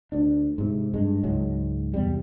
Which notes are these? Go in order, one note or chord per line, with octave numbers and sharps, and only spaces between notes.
D2 D4
G#2 C3
G2 G#3
C#2 G#2 F#3 G#3
E2 C3 G3